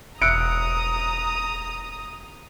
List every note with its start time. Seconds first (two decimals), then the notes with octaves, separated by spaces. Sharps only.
0.22 E1 E5 A#5 D#6 E6 F#6 C#7 D7